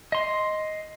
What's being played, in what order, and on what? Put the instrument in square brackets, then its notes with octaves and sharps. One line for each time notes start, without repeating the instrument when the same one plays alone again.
[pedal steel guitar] D#5 C6